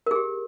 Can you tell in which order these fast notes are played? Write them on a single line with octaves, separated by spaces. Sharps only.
A#4 G#4 G4